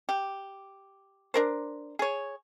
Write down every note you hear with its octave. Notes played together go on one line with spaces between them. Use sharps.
G4
D4 A#4 C5
G#4 C#5